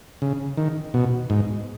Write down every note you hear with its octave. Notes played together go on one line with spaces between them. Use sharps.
C#3
D#3
B2
G#2